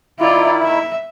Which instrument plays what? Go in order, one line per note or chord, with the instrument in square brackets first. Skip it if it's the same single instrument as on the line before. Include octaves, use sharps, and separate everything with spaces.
[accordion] D#3 E4 [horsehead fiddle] F4 D5
[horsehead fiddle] E5